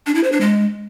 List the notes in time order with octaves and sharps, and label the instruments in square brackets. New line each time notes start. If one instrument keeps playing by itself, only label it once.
[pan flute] D4
E4
C5
D4
G#3